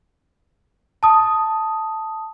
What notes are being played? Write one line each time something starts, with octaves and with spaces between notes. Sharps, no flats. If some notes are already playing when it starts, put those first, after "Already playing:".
A5 D#6